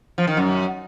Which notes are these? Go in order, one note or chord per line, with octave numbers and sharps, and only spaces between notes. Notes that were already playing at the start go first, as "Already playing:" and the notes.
F3
D#3
F#2